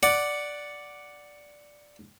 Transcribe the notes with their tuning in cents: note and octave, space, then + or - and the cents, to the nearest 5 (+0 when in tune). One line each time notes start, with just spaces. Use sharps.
D5 +0 F#5 +0